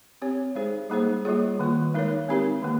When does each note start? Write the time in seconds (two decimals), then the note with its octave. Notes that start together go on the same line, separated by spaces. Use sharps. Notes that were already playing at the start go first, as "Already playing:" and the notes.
0.22 C4 G4 C#5
0.55 G#3 D#4 G#4 C5
0.90 G3 A#3 D#4 G#4 C5
1.25 G3 A#3 F4 G#4 C#5
1.59 D#3 A#3 F4
1.94 G#3 D#4 A#4 C#5
2.28 G#3 C4 D#4 G4 A#4
2.62 D#3 A#3